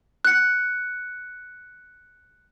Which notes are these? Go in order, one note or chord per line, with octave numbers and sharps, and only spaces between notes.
F#6 C#7